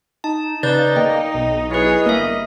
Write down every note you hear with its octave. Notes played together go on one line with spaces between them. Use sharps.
D#4 A5
C#3 D#4 B4 D5 G6 A6
A#3 D#5 G5
B1
E4 G#4 B4 C#5
G1 G3 A#3 A#4 D#5 E5